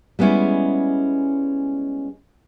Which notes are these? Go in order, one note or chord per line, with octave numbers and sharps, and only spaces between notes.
G3 G#3 B3 C#4 E4